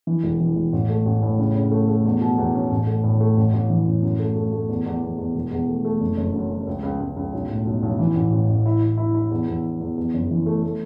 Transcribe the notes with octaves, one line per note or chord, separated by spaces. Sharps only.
E3
E1
E3
E1
A1
A3
A1
A2
C#3
C#3
A3
A3
E2
B2
E2
C#4
A1
A3
A2
A3
A1
A1
E3
A1
F#2
A3
A3
A3
E2
E2
E2
E2
E1
E2
A3
A3
F#1
F#1
F#2
F#2
C#2
C#2
C#2
C#2
B1
A2
B1
B1
E3
A1
A1
A1
E4
E4
E4
E4
E2
E2
E4
E2
E2
F#1
E3
A3
A3